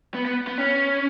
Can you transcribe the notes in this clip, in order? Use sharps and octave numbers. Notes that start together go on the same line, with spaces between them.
B3
B3
B3
C#4